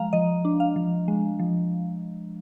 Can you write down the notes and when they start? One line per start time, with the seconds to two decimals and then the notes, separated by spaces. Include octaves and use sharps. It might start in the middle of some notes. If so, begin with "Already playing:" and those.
Already playing: F3 G#3 F5 A#5
0.13 F3 D#5
0.45 D4
0.60 F5
0.76 F3
1.08 G#3
1.39 F3